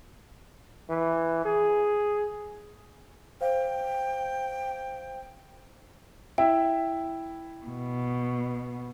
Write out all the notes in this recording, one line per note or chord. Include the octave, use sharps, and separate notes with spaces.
E3
G#4
C5 F5 G5
E4 E5 G5
B2